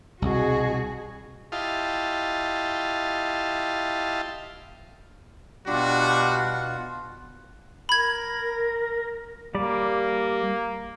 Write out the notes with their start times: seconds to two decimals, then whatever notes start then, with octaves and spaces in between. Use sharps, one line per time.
0.22 C2 B2 F#4 G#4
1.52 E4 F4 G4 D#5 F5 A5
5.67 B2 G3 D4 F4 F#4 F#5
7.89 A#4 B5 G#6
9.55 G3 A#3 D5